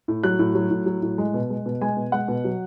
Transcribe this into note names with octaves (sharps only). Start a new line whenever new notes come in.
A2
F#3 F#6
A2
F#3
A2
F#3
A2
G#3
B2
G#3
B2
G#3 G#5
B2
G#3 F#5
B2
F#3